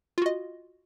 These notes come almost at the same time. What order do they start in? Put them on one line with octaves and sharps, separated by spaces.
F4 F#4 D#5